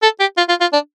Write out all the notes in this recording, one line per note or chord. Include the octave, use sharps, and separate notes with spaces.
A4
G4
F4
F4
F4
D4